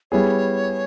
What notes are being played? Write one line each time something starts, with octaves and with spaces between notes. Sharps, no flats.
G3 B3 E4 G#4 C#5